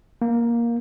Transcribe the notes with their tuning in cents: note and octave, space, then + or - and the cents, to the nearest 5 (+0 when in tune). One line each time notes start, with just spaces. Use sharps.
A#3 +10